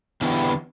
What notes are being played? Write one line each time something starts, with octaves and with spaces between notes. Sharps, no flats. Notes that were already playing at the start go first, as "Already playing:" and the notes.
E2 D3 B3 E4 G4